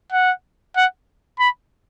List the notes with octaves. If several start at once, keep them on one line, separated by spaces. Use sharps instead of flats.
F#5
F#5
B5